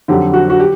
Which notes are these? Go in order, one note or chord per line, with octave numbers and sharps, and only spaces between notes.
F2 D3 F#3 G4
F#4
F#4
G4